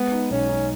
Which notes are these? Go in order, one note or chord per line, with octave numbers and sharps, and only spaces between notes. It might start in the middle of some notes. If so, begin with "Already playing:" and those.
Already playing: G#3 B3
D#4
B1 C#4
D#4